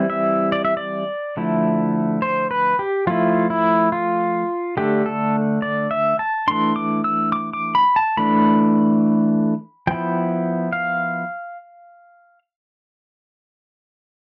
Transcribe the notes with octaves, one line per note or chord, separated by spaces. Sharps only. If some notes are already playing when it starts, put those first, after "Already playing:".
Already playing: E3 G3 C4 E4
E5
D5
E5
D5
D3 F3 A3 E4
C5
B4
G4
F3 A3 E4 F4
E4
F4
D3 A3 D4 G4
A4
D5
E5
A5
E3 A3 D4 C6
D6
E6
D6
D6
B5
A5
E3 A3 D4 B5
F3 B3 E4 G5
F5